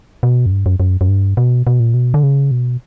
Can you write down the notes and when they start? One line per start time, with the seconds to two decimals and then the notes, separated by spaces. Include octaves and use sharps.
0.23 B2
0.46 F#2
0.51 G2
0.66 F#2
0.80 F#2
1.01 F#2
1.08 G2
1.37 B2
1.67 B2
1.80 A#2
1.94 B2
2.14 D3
2.23 C#3
2.51 B2